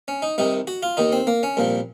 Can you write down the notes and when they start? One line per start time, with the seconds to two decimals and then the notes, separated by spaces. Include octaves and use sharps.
0.08 C#4
0.22 D#4
0.38 C2 C3 D#3 D#4
0.67 F#4
0.83 F4
0.97 D#2 D#3 D#4
1.12 C4
1.27 A#3
1.43 C#4
1.57 C2 A#2 F3